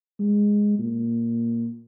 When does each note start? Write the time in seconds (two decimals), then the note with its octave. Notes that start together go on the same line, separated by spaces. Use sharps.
0.20 G#3
0.79 A#2